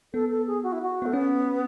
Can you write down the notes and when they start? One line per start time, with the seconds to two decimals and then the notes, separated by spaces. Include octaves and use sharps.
0.13 B3 A4
0.31 A4
0.47 G#4
0.63 F#4
0.72 E4
0.82 F#4
1.02 A3 B3
1.13 B3 C#4